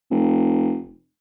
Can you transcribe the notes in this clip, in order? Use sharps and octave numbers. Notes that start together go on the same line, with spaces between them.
F1